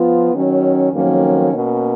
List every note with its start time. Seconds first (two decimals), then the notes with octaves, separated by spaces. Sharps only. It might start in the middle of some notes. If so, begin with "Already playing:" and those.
Already playing: F3 B3 F4
0.34 D#3 F#3 C#4
0.92 F2 D#3 F#3 A#3 C#4
1.51 B2 A#3 C#4